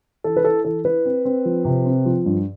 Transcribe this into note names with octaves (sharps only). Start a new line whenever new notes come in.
E3 A4
B4
E4 A4
E3 A4
E4 B4
C4
C4
F3
C3
C4
F3
G2